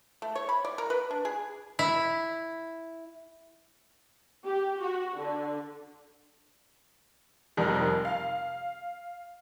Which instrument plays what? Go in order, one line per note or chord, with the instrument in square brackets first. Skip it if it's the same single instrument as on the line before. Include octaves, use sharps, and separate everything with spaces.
[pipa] A3
C#5
B5
D5
A#4
B4
D4
G#4
[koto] E4
[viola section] G4
F#4
D3
[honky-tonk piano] F1 F2 D#3 G3 D#4 A#4
F5